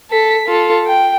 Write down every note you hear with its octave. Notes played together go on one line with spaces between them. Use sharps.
A4 B6
F4 A4
G5